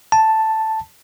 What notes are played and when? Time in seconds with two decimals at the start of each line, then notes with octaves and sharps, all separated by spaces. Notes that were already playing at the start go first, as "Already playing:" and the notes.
0.12 A5